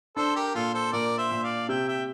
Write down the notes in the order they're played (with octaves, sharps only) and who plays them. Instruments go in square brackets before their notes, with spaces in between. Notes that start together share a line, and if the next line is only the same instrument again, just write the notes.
[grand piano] D4 [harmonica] A4 C5
[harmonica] G4 A#4
[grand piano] A#2 [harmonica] F4 A4
[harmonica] A4 C5
[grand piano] A#2 [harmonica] A#4 D5
[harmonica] C5 E5
[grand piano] A#2
[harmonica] D5 F5
[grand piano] C3 [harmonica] E5 G5
[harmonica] E5 G5